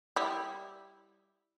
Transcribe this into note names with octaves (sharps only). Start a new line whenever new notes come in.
G3 E4